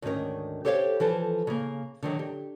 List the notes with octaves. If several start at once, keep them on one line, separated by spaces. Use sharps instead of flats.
D2 G#2 D#3 C#4 A#4
G4 A4 C5 C#5 E5 F5
E3 F3 A4 C5
C#3 A#3
D3 D#3 F#3
G4